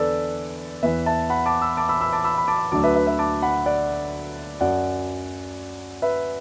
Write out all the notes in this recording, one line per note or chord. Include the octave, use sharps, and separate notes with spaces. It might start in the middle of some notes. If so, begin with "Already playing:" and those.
Already playing: E2 D3 A4 B4 D5
E2 E3 B4 E5
E5 A5
F#5 B5
A5 D6
B5 E6
A5 D6
B5 E6
B5 E6
A5 D6
B5 E6
B5
A5 D6
D2 D3 F#3 A5 D6
B4 E5
B4 E5
B4 E5
A5 D6
F#5 B5
D5 F#5
F#2 F#3 D5 F#5
B4 E5